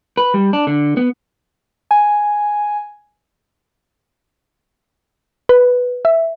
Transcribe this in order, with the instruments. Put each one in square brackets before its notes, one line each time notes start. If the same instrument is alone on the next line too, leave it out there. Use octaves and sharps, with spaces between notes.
[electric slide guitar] B4
G3
D4
D3
B3
[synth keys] G#5
[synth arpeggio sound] B4
E5